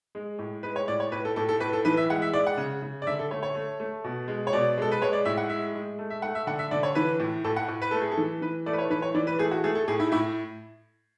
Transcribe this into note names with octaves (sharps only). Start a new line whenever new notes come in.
G#3
A2
G#3 B4
C#5
A2 D5
C#5
A2 B4
A4
A2 A4
A4
A2 B4
A4
E3 B4
E5
G#3 F#5
E5
G#3 D5
F#5
C#3
C#3
D5
D3 E5
A4
A3 C#5
C#5
A3
A3
B2
G#3
C#5
B2 D5
G#3 A4
B4
G#3 C#5
D5
A2 E5
F#5
G#3 E5
G#3
A3
E5
A3 F#5
E5
D3 F#5
E5
D3 D5
C#5
E3 B4
A2
A2 A4
F#5
A2
B4
A3 A4
G#4
A4
E3
E3 B4
A3 D5
B4
C#5
E3 B4
C#5
E3 D5
B4
A3 G#4
F#4
A3 G#4
A4
A2 G#4
E4
A2 E4